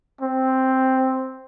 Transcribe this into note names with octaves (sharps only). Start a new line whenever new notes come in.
C4